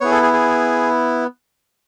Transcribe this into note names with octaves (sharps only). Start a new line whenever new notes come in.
B3 E4 G#4 C#5
A4
G#4
G#4